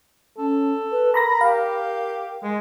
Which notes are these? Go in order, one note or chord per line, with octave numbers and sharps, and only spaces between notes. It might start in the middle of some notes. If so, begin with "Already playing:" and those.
C#4 A4
B4
A#4 A#5 B5 A#6
G4 F5
G#3